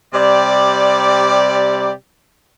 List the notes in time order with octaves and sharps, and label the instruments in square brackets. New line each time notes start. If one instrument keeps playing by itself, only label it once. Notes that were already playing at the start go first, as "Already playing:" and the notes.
[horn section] C3 G3 G4 D5